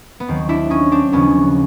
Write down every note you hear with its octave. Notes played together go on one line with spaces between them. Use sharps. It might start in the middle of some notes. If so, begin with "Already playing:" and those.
B3
D#2 D#3 F#3 C4
D4 E4
C#4 D#4
C4 D4
D#2 C#3 F3 B3 C#4